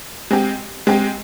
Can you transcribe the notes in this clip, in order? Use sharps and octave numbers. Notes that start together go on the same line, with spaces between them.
G#3 C4 G4
G#3 C4 G4